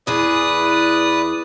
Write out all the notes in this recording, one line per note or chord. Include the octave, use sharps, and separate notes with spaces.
E2 E3 G#4 B4 D5 D#6